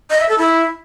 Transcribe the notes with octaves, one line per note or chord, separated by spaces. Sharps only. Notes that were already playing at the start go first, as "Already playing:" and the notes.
D#5
E5
A4
E4